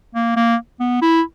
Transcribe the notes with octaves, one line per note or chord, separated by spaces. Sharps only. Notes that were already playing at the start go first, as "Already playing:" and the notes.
A#3
A#3
B3
E4